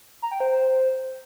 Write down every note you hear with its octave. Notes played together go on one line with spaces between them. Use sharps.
A#5
G5
C5